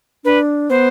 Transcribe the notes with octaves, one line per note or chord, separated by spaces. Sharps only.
D4 B4
B3 C5